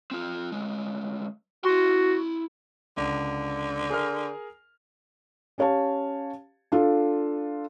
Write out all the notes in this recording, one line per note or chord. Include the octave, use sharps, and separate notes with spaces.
C4 F4
D2 G#3
E4 F#4 C6
C#2 D3
G#4 A#4 F6
C#4 G4 C#5 F5 A5
D4 F4 A4